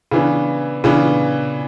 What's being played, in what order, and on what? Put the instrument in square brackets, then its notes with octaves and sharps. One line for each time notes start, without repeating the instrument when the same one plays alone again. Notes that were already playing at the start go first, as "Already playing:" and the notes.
[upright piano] C#3 E3 B3 D4
C#3 E3 B3 D4